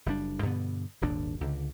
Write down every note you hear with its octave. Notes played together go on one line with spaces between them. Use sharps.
F#1 G3 D4
G2 B2 D3 B3
D#1 G#1 D#2 D4
C#2 D3